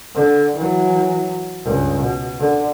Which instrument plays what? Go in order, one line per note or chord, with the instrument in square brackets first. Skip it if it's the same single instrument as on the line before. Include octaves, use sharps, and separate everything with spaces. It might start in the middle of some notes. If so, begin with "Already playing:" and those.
[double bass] D3
E3 F#3
C#2 G2
B2
D3